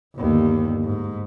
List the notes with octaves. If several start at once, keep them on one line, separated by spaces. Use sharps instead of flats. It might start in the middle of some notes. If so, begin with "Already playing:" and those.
G1 D#2
G#2